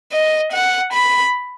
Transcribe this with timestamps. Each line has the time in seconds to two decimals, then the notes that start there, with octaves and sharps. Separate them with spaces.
0.12 D#5
0.53 F#5
0.93 B5